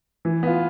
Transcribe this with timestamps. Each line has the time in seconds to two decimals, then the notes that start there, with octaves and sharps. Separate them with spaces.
0.25 E3
0.43 B3 F4